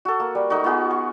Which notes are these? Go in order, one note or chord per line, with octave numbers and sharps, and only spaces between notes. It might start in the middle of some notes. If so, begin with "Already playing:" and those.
F#4 A4
A#3
G3
A3 D#4 F#4
B3 F4 F#4 G#4
C#6